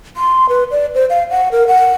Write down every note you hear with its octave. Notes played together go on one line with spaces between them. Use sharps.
C6
B4
D5
C5
F5
F#5
A#4
F#5